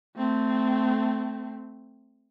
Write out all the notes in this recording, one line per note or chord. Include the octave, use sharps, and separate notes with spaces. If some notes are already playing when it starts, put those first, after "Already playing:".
A3 C4